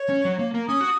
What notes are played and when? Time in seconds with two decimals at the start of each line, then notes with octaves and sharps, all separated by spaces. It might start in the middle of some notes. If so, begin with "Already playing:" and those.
Already playing: C#5
0.09 C#4
0.25 F#3
0.39 A#3
0.54 A#3
0.68 C#4 D#6
0.81 F#4